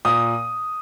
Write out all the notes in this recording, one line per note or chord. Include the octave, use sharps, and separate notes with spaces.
A#2 D#6